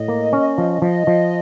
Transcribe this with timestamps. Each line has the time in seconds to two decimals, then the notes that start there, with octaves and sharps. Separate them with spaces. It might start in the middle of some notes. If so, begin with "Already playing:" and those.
Already playing: A2 D#5
0.08 A#3
0.33 C#4
0.58 F3
0.82 F3 D#5
1.07 F3